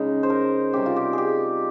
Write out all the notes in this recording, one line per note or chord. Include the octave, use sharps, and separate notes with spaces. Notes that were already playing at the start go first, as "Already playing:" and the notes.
Already playing: C#3 G#3 D#4
C5
A#4
C3 G3 C#4 G4
F4
G4
G4 G#4